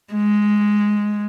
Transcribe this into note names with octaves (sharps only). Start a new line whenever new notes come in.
G#3